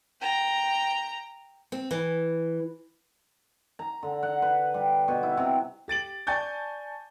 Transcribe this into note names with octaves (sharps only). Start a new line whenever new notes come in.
G5 A#5
C4
E3
A#5
D3
F#5
B4
G3
B2
E4
C3
G4 A6 D7 F#7
D5 G#5 A5 C#6 G6 A6